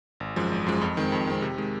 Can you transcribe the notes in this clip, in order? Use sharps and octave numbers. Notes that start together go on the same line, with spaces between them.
G#1
F#2 F3 G#3
G#1
F#2 F3 G#3
F2
D#3 G#3 C4
F2
D#3 G#3 C4
C3
D#3 G#3